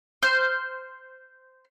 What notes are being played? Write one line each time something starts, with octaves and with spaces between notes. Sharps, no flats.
C5 F6